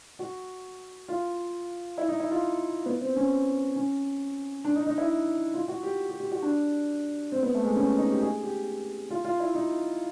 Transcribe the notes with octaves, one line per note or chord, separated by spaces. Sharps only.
F#4
F4
E4
D#4
E4
F4
B3
C4
C#4
C#4
D4
D#4
D#4
E4
F4
F#4
G4
G4
G4
F#4
D4
C4
B3
A3
G#3
C#4
D#4
G4
G#4
G4
F4
F4
E4
D#4